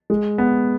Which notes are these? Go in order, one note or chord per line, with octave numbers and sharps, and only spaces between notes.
G#3
B3